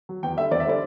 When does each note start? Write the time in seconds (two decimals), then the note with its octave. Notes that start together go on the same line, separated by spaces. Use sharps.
0.09 F#3
0.23 E2 G5
0.37 D3 G3 E5
0.51 E2 D5
0.60 E5
0.66 D3 G3 D5